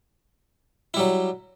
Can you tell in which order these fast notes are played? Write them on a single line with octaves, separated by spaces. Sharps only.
E4 G3 F#3